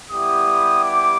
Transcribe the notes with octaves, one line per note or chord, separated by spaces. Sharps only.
G3 B3 E4 G4 D#6
D6